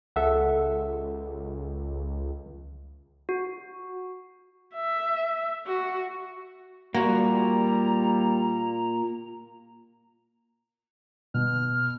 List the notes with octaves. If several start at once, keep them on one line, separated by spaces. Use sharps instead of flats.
C#2 A4 E5 F#5
F#4
E5
F#4
A#2 G3 A#3 F#4 A#5
B2 F6